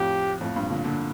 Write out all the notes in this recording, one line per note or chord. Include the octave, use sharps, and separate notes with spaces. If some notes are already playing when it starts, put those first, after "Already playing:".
Already playing: F2 A2 G4
F2 A2
G2 A#2
A#2 D3
A#2 D3